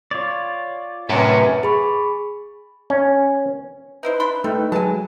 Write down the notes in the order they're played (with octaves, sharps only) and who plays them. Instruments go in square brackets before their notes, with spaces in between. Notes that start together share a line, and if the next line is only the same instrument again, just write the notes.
[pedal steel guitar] F4 C#5 D5
[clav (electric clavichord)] F#2 C3 [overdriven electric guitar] A2 [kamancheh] C#4 B4
[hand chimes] G#4 B5 C#6
[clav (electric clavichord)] C#4
[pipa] D#4 E4 C5 [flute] B4
[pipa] D4 B5 C6
[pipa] G3 [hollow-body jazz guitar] A3 D#4
[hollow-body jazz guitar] F#3 G#3 [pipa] G#5 A5